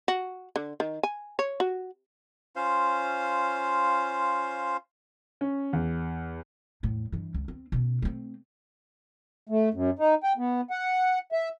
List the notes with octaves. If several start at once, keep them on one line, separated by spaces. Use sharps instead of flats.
F#4
D3
D#3
G#5
C#5
F#4
C#4 F4 C5 F5
C#4
E2
E2 A2
G2 E3
C#2
C4
B2 C#4
A3 C4
A3
F#2
D#4
G5
B3
F#5
E5